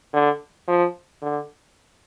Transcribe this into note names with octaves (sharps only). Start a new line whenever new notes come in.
D3
F3
D3